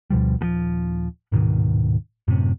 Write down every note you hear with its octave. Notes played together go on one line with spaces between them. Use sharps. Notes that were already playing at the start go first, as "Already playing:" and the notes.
D2 B2 F3 G3
D#1 G#2 F3
D1 G#2 B2 D#3
F#2 A2 C3